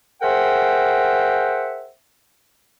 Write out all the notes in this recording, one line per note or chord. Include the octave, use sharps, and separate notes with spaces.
G#4 A#4 C5 E5 F#5 G5